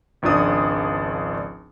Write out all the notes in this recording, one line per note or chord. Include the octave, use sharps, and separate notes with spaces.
G#1 C#2 F3 D4 D#6